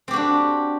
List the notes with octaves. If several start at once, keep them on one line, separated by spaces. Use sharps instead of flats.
C4 D4 F#4 G4